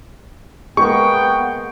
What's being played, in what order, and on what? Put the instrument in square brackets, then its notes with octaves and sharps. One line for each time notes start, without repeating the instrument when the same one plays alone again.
[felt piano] G#3 A#3 [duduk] B3 [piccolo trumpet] G5 [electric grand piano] C#6